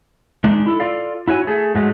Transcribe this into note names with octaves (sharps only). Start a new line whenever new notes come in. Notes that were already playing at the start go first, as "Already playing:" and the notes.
G#3 D4 D#4
E4 A4
F4 A4 D5 F5
E4 F#4 C#5 G#5
A3 G#4
G#2 F#3 G#3 A3